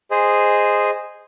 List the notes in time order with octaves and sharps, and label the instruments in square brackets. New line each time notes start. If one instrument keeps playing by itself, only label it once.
[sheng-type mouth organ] G#4 C5 D#5